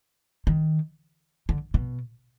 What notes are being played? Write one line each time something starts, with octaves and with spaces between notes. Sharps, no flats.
D#3
D3
B2